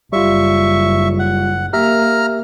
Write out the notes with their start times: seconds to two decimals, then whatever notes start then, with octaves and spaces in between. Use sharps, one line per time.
0.13 F#1 G3 F4 E5 C#6
1.19 F#5
1.73 A#3 G4 E5 A#5 F6